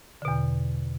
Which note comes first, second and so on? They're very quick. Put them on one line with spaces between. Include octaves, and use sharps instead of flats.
D3 B2 E2